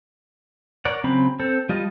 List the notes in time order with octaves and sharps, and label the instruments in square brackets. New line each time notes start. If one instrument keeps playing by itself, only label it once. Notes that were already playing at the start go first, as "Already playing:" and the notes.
[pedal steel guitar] A#4 C#5 D5 F#5
C#3 F#3 C4 A#5 B5
C4 A4
G3 F4 D#5 A5